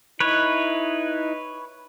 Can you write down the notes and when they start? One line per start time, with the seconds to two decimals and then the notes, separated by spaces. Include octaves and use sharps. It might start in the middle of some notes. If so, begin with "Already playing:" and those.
0.20 D#4 E4 B4 C#5